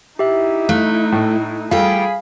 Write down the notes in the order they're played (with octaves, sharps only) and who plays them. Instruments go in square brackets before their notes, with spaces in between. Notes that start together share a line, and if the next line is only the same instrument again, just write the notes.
[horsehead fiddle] D#4 E4 [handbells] G4 E5
[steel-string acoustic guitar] A3 [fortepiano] F5 [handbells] F#6
[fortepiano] A2
[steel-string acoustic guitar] G3 G5 [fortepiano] F4 A4 [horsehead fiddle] G#4 B5 [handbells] F5